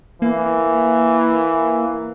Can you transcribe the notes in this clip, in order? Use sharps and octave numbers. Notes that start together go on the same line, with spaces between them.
E3 A#3